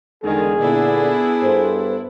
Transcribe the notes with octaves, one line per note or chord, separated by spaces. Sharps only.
E2 D3 D#3 G#3 G#4
A#2 D3 B3 D4 E4
G2 A4 C5